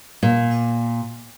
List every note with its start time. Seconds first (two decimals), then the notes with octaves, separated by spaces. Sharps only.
0.23 A#2